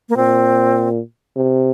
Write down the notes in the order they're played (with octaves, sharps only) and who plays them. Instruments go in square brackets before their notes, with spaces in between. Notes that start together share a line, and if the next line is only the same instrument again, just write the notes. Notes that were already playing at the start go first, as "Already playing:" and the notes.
[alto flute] A#3
[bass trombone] A#2 [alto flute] C4
[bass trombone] C3